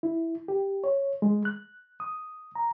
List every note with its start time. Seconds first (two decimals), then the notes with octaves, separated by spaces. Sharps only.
0.03 E4
0.48 G4
0.84 C#5
1.22 G#3
1.45 F#6
2.00 D#6
2.55 A#5